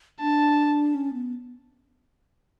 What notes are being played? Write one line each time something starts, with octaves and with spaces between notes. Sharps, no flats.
D4 A5
C#4
B3